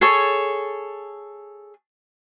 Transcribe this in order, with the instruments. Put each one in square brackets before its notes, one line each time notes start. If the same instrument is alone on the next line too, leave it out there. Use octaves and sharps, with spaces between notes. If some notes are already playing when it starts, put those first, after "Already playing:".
[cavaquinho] G#4 A4 C#5